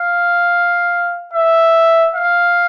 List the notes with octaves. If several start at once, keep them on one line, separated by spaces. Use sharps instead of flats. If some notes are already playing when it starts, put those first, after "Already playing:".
Already playing: F5
E5
F5